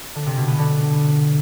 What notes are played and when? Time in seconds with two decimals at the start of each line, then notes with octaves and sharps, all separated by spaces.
0.15 D3
0.26 C3
0.37 B2
0.48 B3
0.58 D3